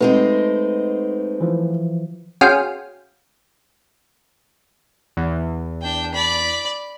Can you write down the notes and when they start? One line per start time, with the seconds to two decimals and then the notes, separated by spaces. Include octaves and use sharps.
0.01 G#3 A3 C4 D#4 F#4 B4 A5
1.40 E3 F3
2.41 C#4 F#4 G#4 F5 G5 C6
5.17 E2
5.82 D4 G5
6.14 D5 B5